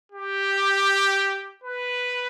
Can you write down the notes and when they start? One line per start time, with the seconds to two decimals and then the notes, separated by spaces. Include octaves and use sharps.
0.12 G4
1.64 B4